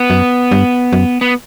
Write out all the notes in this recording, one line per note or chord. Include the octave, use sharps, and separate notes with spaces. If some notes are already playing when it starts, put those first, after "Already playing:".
Already playing: B3
F#2
G2
F#2
B3